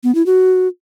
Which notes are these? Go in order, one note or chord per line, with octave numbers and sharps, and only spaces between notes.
B3
E4
F#4